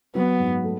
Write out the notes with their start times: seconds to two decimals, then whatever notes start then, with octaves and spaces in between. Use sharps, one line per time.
0.15 F#3 B3
0.40 G#2
0.64 A3